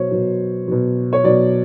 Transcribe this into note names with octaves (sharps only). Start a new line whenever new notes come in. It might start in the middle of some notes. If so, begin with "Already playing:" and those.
Already playing: B2 F#3 C5 C#5
B2 F#3
B2 F#3
C#5
B2 F#3 D5